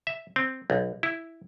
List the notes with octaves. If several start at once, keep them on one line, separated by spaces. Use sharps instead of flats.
E5
C4
B1
E4